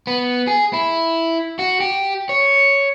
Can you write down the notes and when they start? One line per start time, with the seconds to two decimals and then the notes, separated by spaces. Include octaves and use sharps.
0.07 B3
0.47 G#4
0.73 E4
1.59 F#4
1.80 G4
2.29 C#5